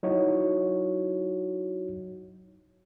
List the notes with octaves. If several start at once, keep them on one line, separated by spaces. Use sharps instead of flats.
F#3 D#4 E4 F#4 C#5